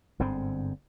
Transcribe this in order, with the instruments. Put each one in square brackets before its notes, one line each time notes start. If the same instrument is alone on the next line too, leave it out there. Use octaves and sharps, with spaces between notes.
[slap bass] G1 G#2 D3 C4